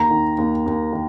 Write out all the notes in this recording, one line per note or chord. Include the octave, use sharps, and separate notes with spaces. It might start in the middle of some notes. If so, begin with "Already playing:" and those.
Already playing: D#2 A#5
D#3
D#2
D#2
D#3